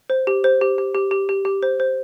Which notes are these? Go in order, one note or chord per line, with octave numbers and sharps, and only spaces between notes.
C5
G4
C5
G4
G4
G4
G4
G4
G4
C5
C5